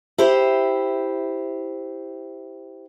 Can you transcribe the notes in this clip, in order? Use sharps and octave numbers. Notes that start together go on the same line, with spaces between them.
E4 G4 C5